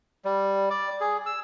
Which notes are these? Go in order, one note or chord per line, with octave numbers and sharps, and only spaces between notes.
G3
D5
G#4
E6